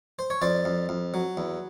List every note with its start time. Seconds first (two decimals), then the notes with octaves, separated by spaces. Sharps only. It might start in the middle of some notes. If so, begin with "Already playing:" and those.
0.19 C5
0.30 C#5
0.42 F2 C5 D5
0.65 F2
0.89 F2
1.14 F#3
1.37 E2